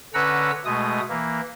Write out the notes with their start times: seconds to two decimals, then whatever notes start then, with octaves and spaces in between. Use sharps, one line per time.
0.14 D3 C#4 B4 F#5 A#5 E6
0.65 B2 G#3 A3 D#6
1.09 E3 A#3